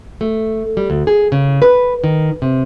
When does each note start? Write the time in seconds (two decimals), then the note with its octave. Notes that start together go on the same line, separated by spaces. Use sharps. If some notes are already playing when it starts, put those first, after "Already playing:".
0.21 A3
0.77 G3
0.90 D2
1.07 G#4
1.32 C#3
1.62 B4
2.04 D#3
2.42 C3